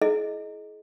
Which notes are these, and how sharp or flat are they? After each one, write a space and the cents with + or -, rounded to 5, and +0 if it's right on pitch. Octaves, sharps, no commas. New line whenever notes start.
E4 +0 G#4 +40 D#5 +0